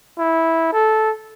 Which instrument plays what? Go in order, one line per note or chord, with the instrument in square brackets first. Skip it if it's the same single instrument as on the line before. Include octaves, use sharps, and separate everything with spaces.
[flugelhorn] E4
A4